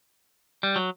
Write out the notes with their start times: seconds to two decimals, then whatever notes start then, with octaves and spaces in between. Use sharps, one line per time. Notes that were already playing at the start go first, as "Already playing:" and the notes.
0.63 G3
0.76 F#3